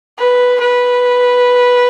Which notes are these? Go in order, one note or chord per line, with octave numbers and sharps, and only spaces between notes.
B4
B4